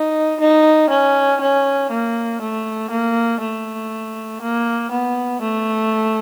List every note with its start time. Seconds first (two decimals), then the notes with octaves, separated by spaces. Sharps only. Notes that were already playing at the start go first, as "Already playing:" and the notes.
Already playing: D#4
0.40 D#4
0.90 C#4
1.41 C#4
1.91 A#3
2.41 A3
2.91 A#3
3.42 A3
4.42 A#3
4.92 B3
5.42 A3